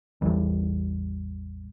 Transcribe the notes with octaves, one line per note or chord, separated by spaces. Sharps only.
A1 E2 E3 G3